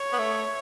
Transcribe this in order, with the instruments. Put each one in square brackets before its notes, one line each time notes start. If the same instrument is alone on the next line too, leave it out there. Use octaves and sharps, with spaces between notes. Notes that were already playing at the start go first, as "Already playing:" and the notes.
Already playing: [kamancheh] C#5
[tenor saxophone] B3
A3